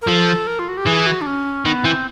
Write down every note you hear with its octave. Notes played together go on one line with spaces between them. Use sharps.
A#4
F3 A4
A#4
F4
F#4
G4
E3 G#4
F#4
D4
C#4
D#3 B3
E3 C4